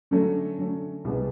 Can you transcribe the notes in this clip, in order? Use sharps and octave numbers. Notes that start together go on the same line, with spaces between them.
D3 F#3 A3 C#4
D3 F#3 A3 C#4
C2 B2 G#3 B3